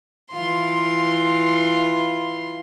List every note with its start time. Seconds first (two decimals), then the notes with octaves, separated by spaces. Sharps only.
0.31 E3 F4 C6